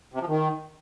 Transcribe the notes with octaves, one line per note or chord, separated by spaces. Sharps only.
C3
F3
D#3